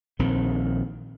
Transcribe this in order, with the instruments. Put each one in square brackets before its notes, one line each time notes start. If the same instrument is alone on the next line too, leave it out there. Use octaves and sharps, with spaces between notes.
[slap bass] A#1 D#3 C4